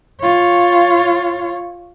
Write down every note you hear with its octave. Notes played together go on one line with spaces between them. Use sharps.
F4 C#5